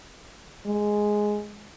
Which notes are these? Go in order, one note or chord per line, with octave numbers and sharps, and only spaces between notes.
G#3